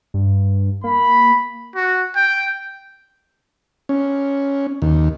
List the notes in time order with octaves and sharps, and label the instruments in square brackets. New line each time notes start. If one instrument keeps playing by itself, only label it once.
[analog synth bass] G2
[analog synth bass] A#3 [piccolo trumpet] B5
[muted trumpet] F#4
G5
[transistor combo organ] C#4
D#2